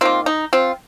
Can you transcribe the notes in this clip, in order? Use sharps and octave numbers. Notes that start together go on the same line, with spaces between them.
D#3 A#3 C4 F4
D#4
C4 F4